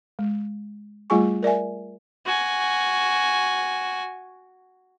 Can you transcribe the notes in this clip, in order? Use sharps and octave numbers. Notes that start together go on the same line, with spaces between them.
G#3
G3 A3 F4 G#4 G#5 C#6
A#4 D5 E5 G#5
F#4 G#5